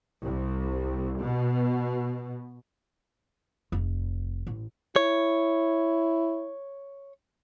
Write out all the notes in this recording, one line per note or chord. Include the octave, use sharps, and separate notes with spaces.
C2
B2
F1
A1
E4 C#5